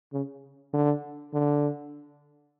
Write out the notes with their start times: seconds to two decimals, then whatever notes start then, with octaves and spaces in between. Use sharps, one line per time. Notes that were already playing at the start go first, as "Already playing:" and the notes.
0.13 C#3
0.73 D3
1.33 D3